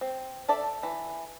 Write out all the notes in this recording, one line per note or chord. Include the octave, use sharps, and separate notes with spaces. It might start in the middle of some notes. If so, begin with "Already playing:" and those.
C4
D4 A4 D5 E5
E3